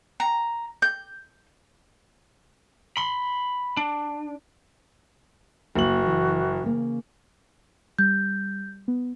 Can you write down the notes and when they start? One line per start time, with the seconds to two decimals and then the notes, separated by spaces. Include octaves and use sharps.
0.20 A#5
0.82 G6
2.97 B5 C6
3.77 D4
5.75 F#1 A#3 F#4 F#7
6.06 E3
6.64 C#3 A#3
7.99 G3 G6
8.88 B3